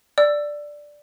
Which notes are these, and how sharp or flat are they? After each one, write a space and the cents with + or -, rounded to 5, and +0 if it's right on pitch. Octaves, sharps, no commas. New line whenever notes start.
D5 +0 E6 +15